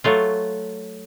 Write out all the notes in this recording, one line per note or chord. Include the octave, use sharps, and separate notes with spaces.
F#3 A3 F4